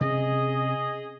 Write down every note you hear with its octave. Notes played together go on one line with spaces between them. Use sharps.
C3 C#4 G#4 D#5